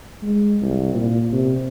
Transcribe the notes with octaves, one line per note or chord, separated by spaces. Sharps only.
G#3
C2
A#2
C3